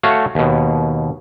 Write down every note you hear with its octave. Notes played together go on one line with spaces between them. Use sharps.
A3 F#4 C#5 F5
D#2 B2